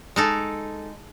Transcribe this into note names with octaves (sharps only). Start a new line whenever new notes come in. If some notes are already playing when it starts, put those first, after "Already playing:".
G#3 D#4 A4